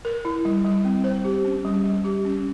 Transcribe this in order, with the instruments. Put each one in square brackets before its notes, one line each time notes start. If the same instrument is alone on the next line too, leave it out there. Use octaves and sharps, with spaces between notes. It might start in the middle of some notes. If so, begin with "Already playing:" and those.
[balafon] A#4
E4
G3
G3
C4
C5
G4
C#4
G3
G3
G4
C#4